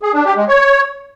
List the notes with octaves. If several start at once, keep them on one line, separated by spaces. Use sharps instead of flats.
G#4
D4
G4
G#3
C#5